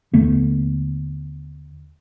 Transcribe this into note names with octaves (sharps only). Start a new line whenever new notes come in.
D#2 D3 A3 B3